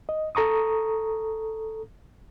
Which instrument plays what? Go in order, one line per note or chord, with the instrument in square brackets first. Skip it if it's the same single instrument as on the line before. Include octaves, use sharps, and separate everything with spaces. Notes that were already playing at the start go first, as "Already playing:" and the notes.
[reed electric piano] D#5
A4 A#5 C#6 D#6